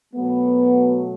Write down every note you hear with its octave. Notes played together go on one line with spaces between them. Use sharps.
B2 F#3 A3 B3